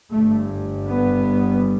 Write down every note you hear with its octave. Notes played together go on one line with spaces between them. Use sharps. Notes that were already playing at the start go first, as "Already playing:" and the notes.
G1 G2 A3
B3